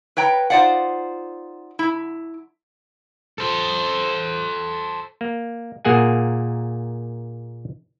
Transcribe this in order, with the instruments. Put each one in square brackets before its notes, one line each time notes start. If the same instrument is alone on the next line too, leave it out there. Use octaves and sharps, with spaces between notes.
[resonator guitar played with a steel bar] B4 C#5 G5 A#5
D#4 F4 C5 D5 F5 F#5
E4
[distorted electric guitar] A4 C5
[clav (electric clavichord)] A#3
A#2 A#3 G#4 F#5 G#5